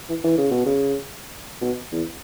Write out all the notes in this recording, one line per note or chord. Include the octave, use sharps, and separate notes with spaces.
E3
E3
C#3
B2
C#3
B2
E2